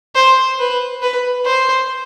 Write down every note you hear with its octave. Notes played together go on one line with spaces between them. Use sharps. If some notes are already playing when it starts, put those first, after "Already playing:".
C5
B4
B4
C5